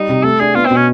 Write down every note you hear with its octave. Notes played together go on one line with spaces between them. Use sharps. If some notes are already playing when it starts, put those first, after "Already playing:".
Already playing: G3 D#4
C3
A3 A4
D4 G#4
B3 F4
B2 C4
C#4